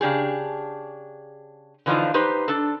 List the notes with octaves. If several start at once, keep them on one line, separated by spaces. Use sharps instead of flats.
C#3 D4 G4 G#4
D3 E3 F3 D4 D#4 F4
D#4 G4 B4 C5
D4 A4